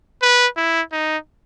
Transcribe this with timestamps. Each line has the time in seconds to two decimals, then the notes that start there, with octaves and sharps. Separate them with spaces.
0.22 B4
0.57 E4
0.92 D#4